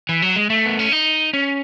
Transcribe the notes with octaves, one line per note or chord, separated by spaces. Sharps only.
E3
F#3
G#3
A3
B3
C#4
D#4
C#4